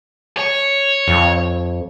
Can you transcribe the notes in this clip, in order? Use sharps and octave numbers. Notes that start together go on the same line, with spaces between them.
C#5
F2